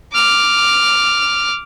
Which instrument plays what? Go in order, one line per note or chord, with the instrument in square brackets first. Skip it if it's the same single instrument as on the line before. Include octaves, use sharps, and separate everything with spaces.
[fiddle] D6 F6